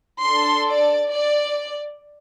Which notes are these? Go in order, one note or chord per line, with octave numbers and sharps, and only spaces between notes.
D4 A4 C6
D5
D5